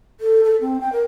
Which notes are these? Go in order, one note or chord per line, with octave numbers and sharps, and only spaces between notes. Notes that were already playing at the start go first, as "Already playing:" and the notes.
A4
A4
C4
G5
A#4